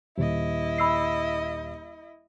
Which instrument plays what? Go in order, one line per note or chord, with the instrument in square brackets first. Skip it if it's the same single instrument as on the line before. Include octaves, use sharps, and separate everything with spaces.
[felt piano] D#1 [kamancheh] E4 D#5
[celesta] B5 E6 C7